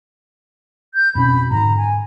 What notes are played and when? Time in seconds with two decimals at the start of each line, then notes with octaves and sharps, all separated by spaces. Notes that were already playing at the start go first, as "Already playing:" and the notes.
0.94 G6
1.15 F2 B2 C#4 B5
1.51 G#2 D3 A#5
1.77 G#5